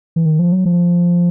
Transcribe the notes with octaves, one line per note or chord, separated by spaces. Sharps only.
E3
D#3
F3
F#3
F3